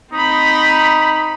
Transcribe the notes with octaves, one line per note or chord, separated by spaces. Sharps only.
C4 D#4 B5